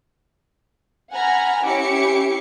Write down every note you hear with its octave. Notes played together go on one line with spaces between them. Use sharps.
F#5 G#5 A#5 B5 F6
C#4 E4 G4 E5 D6 C#7